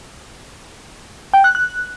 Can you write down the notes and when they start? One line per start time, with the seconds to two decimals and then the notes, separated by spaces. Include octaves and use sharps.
1.33 G5
1.44 F#6
1.55 F#6